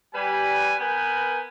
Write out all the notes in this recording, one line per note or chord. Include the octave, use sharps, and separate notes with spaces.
G3 B4 G#5
B3 A#4 B4 G5 G#5